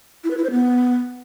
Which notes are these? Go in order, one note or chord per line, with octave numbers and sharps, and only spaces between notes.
E4
B4
E4
C5
B3